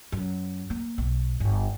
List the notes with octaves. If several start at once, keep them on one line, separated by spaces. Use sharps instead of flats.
F#2
A#3
B1
G1